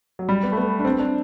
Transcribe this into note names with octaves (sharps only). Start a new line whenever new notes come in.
F#3
G3
B3
A3
B3
D4
C4
D4